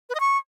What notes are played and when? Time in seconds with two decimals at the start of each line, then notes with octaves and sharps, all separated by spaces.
0.09 B4
0.15 D#5
0.20 C#6